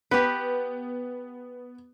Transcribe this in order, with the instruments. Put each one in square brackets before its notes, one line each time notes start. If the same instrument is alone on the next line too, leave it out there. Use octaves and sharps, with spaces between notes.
[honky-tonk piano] B3 [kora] G4 B4